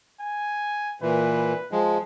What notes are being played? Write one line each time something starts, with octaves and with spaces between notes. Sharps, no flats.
G#5
A#2 E3 B4
F3 G#3